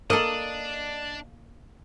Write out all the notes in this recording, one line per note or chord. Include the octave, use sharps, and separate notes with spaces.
A#3 D4 A4 D#5